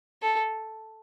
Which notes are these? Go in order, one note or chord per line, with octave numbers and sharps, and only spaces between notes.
A4